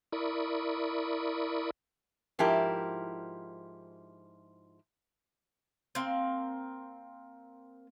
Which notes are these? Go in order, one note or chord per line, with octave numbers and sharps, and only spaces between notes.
E4 A#4 D5 B5 C#6 D#6
G#2 F3 E4 G4 A#4
A#3 C4